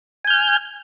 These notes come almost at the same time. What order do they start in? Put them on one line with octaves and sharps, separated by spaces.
G#5 G6 F6